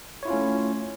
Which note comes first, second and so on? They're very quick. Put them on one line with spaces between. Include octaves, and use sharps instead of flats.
C#5 E4 F4 C#4 A3